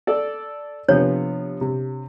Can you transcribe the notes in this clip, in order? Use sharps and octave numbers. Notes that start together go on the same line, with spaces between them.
A4 D5
C3 F3 B3 D4 C#5
C3